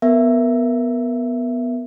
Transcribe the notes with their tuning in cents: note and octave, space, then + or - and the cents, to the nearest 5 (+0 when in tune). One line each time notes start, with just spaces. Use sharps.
B3 +0 A#4 +0 E5 +15